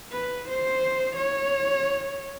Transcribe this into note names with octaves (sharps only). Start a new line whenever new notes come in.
B4
C5
C#5